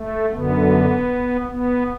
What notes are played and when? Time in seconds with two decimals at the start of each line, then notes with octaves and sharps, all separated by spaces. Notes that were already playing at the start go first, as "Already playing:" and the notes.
Already playing: A3
0.30 F#2 D3 B3
1.48 B3